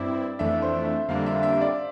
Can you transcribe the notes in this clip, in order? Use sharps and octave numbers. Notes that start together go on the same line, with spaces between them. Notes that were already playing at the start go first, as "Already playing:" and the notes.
Already playing: G2 C4 E4 D5
F2 E3 A3 D4 E5
C5
E5
F2 D3 G3 A#3 D4 F5
E5
E5
D5